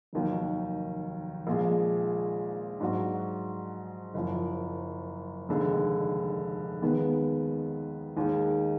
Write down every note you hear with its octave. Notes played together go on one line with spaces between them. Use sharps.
F1 D#2 D#3 F#3
A#1 A#2 F3 G#3
G#2 F#3 D4 F#4
F#1 F#2 F3
F1 D#2 D3 G#3
D#2 D#3 G#3 B3
D#2 D#3 G#3